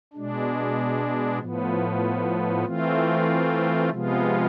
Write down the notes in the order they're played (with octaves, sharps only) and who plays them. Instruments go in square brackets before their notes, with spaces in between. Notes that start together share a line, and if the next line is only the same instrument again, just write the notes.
[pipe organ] B2 G#3 D4
A2 F3 B3
E3 A3 C4 F4
C3 F3 G#3 B3 F4